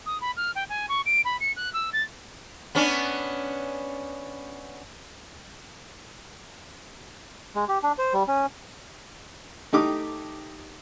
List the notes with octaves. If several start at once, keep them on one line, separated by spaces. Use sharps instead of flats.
D#6
B5
F6
G5
G#5
C#6
D7
B5
C#7
F#6
E6
A6
B3 C#4 D4
G#3
G4
D4
C5
G3
C#4
A3 D#4 G4 D6 D#6